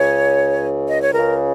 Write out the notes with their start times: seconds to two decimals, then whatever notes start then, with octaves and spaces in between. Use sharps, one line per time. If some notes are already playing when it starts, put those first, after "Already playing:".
Already playing: C#2 C#3 C#5
0.89 D#5
1.01 C#5
1.13 C#2 C#3 A#4